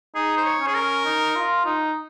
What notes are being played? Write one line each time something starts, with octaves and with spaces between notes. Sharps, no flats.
D#4 G#4
C5
C#5
C#4
G#4
A#4
D#4
F4
D#4